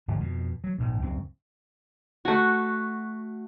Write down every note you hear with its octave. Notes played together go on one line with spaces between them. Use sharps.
G1 G#2 D3 F3
F2 B2
F#3
A#1 G#2 B2
C#2 F#2 C4
A3 F#4